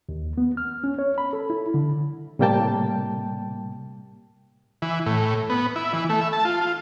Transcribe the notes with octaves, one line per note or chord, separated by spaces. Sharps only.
D#2
B3
F6
C#4
C#5
B5
A4
E4
D3
A2 C3 G3 A#3 G5 A5
E3
A2
B3
E4
E3
A3
E5
A5
F4
F4